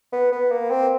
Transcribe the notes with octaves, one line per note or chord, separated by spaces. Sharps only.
B3
B3
A#3
C4